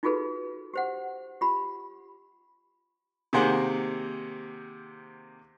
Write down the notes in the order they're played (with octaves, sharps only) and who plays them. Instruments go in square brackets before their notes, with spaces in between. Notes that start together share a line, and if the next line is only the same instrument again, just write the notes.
[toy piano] D#4 F4 F#4 G#4 A4 B4
G4 C5 F#5
F4 G4 B5
[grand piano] C3 D#3 A#3 G#4 C5 F#5